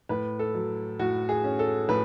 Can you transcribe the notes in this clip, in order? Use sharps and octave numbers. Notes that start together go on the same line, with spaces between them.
A2 B4
A4
F#3
A2 F#4
G#4
C#4
A4
A2 B4